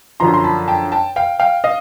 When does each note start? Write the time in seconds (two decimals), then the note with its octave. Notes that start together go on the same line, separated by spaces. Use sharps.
0.20 F#2 D3 F3 A#5 C6
0.34 C6
0.44 A5 B5
0.68 G5 A5
0.92 G5 A5
1.16 F5 G5
1.40 F5 G5
1.64 D#5 F5